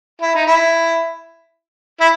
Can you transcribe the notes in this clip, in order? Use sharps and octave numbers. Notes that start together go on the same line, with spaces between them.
E4
D#4
E4
E4